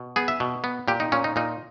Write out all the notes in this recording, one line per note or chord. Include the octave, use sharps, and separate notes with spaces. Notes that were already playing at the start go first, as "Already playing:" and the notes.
Already playing: B2
B3 G#4
E5
B2
B3
A#2 G4
D#4
A#2 C#4
D#4
A#2 D#4